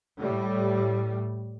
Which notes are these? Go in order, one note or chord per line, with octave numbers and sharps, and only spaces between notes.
A2 G3